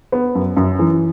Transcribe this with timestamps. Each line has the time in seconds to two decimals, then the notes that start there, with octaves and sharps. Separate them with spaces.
0.12 B3
0.35 F#2
0.57 F#2
0.79 E3